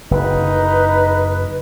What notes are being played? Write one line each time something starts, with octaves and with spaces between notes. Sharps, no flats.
F#1 D#4 B4